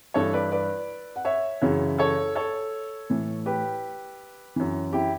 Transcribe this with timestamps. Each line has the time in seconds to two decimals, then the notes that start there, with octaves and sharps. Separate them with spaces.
0.14 G2 E3 A4 C#5
0.33 B4 D5
0.52 B4 D5
1.16 F#5
1.25 C#5 E5
1.62 F#2 C#3 E3
1.99 A4 C#5
2.35 A4 C#5
3.10 A2 E3
3.46 G4 B4
4.56 F#2 E3
4.93 E4 G4